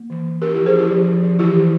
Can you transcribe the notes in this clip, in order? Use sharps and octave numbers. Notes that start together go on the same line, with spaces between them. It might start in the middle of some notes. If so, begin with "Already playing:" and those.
Already playing: A#3
E3
E3
C#4 G4 A#4
E4 G4
F3
G#4 C5
C#4 E4 G4
F3
F3
F3
E3 E4 G4
E3